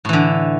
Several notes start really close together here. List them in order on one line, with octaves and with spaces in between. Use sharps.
A2 E3 D3